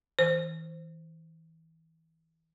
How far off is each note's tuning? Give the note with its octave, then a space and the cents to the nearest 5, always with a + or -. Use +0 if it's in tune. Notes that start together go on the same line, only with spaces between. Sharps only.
E3 -30 C5 +0